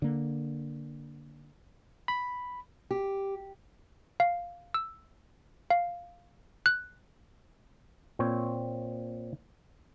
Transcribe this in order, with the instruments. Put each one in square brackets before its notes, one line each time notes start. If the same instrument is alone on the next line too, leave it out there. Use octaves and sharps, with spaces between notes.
[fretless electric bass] D3 A#3
[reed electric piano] B5
[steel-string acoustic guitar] G4
[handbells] F5
E6
F5
F#6
[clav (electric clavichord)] A#2 C4 C5 C#5